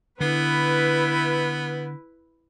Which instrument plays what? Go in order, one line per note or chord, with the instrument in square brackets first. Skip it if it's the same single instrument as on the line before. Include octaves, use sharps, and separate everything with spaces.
[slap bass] D3 [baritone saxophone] B3 [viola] E4 B4